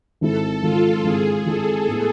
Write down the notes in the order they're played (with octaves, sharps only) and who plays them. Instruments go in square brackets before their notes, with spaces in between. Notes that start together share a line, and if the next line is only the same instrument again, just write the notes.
[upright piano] G#1 G#2 G#3 C4 E4 [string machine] A4
[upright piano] G#1 G#2 G#3 C4 E4 [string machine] F4
[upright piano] G#1 G#2 G#3 C4 E4 [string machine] G#4
[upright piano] G#1 G#2 G#3 C4 E4 [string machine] A4
[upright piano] A2 G#3 B3 E4